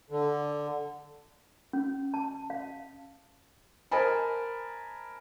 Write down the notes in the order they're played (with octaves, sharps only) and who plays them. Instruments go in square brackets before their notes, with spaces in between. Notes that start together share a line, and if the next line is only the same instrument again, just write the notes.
[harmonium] D3
[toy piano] C#4
A5
F5
[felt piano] A#4 C5 D#5 G#5 A5 B5